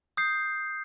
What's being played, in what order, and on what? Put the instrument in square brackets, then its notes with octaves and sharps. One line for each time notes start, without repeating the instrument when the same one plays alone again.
[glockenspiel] D#6 G6 C7